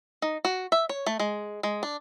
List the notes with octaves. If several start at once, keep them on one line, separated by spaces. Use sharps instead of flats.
D#4
F#4
E5
C#5
A3
G#3
G#3
D4